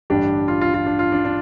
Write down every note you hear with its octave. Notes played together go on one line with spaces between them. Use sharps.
A1 G2 D3 D4 G4
F4
F4
F4
D4
F4
D4
D4